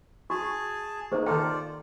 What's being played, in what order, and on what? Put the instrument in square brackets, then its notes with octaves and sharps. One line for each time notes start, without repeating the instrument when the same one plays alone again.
[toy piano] F#4 C#6 [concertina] G#4 G#5 A5
[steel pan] A#3 D#4 [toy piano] G4 C5
[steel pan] D#3 A4 A#4 [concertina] F4 C5 D5 [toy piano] G5